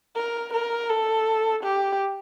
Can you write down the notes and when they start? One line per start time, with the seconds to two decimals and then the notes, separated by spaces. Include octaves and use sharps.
0.16 A#4
0.53 A#4
0.90 A4
1.63 G4